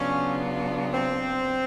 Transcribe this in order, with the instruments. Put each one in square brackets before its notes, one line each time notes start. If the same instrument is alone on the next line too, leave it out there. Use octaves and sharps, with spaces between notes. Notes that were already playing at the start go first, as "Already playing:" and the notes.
Already playing: [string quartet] C#3 F#3 B3 D4 F4 [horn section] C#4
[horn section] C4